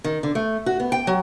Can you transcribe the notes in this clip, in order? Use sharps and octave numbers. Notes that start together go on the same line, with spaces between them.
D#3
D3
A3
F#4
B3
G5
F#3